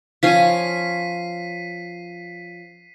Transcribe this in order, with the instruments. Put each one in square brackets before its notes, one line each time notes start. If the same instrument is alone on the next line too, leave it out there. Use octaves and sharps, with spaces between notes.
[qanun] F3 C#4 G#5 [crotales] B6 C7 D#7